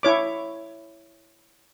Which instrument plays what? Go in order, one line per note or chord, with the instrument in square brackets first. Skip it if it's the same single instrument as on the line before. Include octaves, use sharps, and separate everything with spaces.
[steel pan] E4 C#5 D6